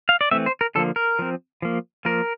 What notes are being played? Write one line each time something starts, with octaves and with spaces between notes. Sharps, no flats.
F5
D5
E3 A3 C4 E5
C5
A#4
D3 F3 A#3 A4
A#4
F3 C4
F3 A#3
F3 A#3 A#4